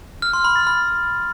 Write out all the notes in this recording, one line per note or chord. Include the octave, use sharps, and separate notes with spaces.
F6
C6
B5
A6
B5